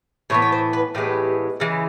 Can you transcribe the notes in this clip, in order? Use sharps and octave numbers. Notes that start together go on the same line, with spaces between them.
A2 E3 B3 C#5
C#5
C5
B4
A2 E3 G#3 B3 G4
C#3 E3 G#3